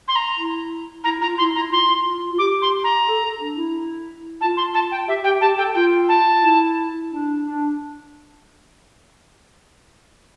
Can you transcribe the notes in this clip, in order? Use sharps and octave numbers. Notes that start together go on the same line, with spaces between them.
C6
A#5
E4
E4 A#5
F4 A#5
E4 C6
E4 A#5
F4 C6
F4
F4
G4 D6
C6
A#5
A4
A4
D4
E4
F4 A5
C6
A5
G5
G4 E5
G4 G5
G4 A5
A4 G5
F4 G5
A5
E4
D4
D4